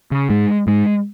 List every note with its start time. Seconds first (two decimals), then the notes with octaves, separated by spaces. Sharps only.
0.12 C#3
0.30 G#2 G#3
0.67 G#2 G#3